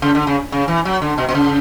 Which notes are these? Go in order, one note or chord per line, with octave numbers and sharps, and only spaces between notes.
C#3
D3
C#3
C#3
E3
F#3
D3
B2
B2
C#3